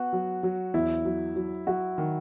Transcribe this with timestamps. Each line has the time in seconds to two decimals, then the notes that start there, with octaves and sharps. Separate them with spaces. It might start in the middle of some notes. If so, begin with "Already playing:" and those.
Already playing: B3 F#4
0.13 F#3
0.43 F#3
0.74 E2 E4
1.05 F#3
1.36 F#3
1.67 F#3 F#4
1.98 D#3